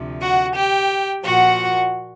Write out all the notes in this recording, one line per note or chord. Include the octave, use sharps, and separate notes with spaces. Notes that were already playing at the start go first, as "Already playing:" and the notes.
Already playing: D2 C3 F3
F#4 F#5
G4 G5
A#2 F3 F#4 F#5